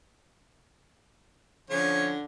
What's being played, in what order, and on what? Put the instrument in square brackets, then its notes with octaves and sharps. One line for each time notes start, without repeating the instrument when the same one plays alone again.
[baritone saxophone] D3 [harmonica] F3 C#4 C#5